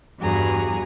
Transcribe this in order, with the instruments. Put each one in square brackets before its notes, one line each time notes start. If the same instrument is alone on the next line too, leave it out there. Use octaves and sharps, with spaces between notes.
[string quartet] E2 G2 G3 F#4 G#4 A#5